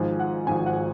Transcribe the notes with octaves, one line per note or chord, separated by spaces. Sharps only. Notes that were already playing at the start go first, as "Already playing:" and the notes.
Already playing: G#1 G#2 F3 G#5
F#5
G#1 G#2 F3 G#5
F#5